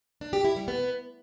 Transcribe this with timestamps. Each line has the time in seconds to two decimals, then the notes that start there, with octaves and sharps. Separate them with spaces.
0.21 D4
0.33 G4
0.45 E4
0.56 G3
0.68 B3